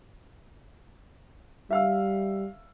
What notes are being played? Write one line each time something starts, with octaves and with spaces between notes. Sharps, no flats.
G3 E5 F5 E6